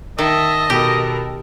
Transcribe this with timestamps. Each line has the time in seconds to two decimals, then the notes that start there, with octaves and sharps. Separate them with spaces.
0.18 D#3 D#5 E5 A5
0.70 B2 G4 A4 A#4